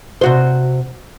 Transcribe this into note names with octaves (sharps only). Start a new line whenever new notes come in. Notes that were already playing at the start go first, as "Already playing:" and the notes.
C3 F#4 C5